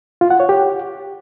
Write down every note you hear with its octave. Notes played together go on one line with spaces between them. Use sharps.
F4
F#5
C#5
G4